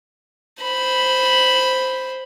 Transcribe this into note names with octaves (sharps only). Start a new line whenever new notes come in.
C5 B5